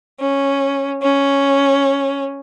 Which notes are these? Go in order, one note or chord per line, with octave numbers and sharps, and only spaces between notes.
C#4
C#4